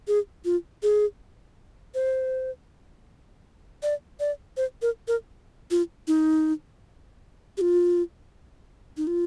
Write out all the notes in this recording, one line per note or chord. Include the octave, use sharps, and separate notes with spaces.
G#4
F4
G#4
C5
D5
D5
C5
A#4
A#4
F4
D#4
G4
F4
D#4
F4